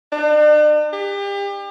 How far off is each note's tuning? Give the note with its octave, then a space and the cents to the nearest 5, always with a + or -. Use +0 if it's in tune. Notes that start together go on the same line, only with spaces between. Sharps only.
D4 +45
G4 +35